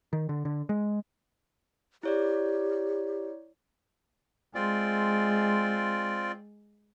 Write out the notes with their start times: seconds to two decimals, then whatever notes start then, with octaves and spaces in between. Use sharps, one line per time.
0.13 D#3
0.29 D3
0.45 D3
0.69 G#3
2.03 E4 G4 C#5 D5
4.55 G#3 C4 F4 D5